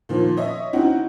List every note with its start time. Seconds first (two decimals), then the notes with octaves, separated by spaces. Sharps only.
0.09 A#2 D#3 F3
0.37 C#5 D#5 E5
0.73 C4 C#4 D#4 E4 F#4